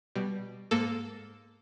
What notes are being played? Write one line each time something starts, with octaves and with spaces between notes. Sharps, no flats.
B2 G3
G#2 A#3 A4